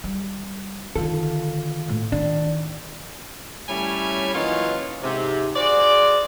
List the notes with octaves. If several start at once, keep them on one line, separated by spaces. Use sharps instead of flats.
G3
D3 D#3 F4 A4
A2 A#3
D#3 D4
G3 A3 C#4 E4 C#5 G#5
E3 F#3 A#3 C#4 D#4 F4
G#2 C3
F#4 G#4 C5 D5